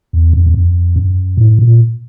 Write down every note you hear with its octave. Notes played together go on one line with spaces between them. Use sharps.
E2
F2
E2
F2
F#2
A2
A#2